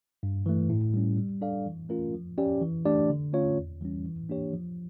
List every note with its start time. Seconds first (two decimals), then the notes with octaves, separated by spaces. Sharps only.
0.23 G2
0.46 E3 A3
0.70 A2
0.94 G3 C#4
1.17 G3
1.41 D4 A4 D5 F5
1.66 E3
1.89 A3 C#4 F4 A#4
2.14 F3
2.38 C#4 G4 D5
2.62 E3
2.85 A3 D4 G4 D5
3.10 D3
3.33 A3 C#4 F4 C#5
3.58 E2
3.81 E3 G3 C#4
4.05 E3
4.29 A#3 D4 G4 C#5
4.54 F3